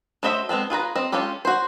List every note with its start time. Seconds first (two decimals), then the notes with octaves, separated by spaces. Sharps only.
0.23 A3 F#4 C5 D#5 E5
0.49 G#3 B3 C4 A4
0.70 F4 G#4 B4 A#5
0.95 C4 D#5
1.12 G#3 C#4 F4 G4 A4
1.45 F#4 C5